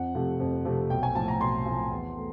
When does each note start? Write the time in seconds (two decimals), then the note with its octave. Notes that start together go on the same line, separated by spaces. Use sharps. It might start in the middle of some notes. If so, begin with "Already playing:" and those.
Already playing: F2 F#5
0.15 C3 F3 A3
0.40 F2
0.65 C3 F3 A3
0.90 B1 G5
1.03 G#5
1.15 A2 F3 A5
1.28 A#5
1.41 B1 C6
1.66 A2 F3
1.91 E2
2.16 A3